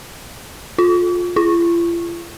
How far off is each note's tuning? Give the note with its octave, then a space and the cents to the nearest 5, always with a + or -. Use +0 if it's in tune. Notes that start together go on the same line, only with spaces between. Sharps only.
F4 +20
F4 -45